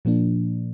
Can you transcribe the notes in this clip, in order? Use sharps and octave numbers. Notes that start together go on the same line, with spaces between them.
A#2 F3 A#3 D4